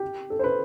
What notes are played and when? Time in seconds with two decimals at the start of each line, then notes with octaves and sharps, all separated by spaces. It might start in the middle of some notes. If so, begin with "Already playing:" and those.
Already playing: G4
0.30 A4
0.39 C5
0.44 B4